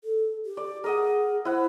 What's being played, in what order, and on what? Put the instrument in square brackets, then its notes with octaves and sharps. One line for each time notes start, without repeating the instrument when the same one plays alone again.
[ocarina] A4
G4
[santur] D5
[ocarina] G#4 [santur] A#4 D#5 F#5
[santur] E4 F#5 [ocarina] C5